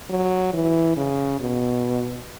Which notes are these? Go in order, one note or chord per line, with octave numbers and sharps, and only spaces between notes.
F#3
E3
C#3
B2